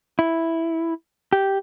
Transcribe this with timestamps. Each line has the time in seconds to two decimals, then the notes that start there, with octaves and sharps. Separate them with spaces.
0.19 E4
1.33 G4